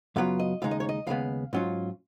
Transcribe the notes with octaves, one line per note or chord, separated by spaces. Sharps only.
F#2 C#3 F#3 B3 F4 F5
D#5
D#2 C#3 G#3 D#4 F5
D#5
C#5
D#5
D#2 C#3 G#3 B3 F5
G#2 F#3 C#4 F4